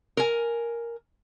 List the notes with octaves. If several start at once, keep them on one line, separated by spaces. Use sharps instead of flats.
A#4 G#5